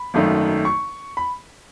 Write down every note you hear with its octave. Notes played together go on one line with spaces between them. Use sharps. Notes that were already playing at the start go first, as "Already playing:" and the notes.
Already playing: B5
G#1 F#2 D#3 A3 D#4
C#6
B5